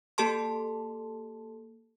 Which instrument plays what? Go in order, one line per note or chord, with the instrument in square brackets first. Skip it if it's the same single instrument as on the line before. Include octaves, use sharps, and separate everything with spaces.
[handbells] A#3 G4 A4 A5 C6